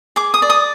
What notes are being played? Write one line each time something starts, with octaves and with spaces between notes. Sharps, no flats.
G#4 D6
D#6
D5
D#6